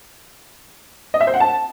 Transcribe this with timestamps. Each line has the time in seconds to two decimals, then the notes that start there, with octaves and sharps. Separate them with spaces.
1.14 D#5
1.21 E5
1.27 C5
1.34 F#5
1.40 A5